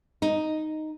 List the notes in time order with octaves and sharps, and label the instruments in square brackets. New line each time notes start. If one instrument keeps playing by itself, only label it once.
[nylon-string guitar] D#4